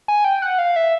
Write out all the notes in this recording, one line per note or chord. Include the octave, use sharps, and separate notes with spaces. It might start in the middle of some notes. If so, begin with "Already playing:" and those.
G#5
G5
F#5
F5
E5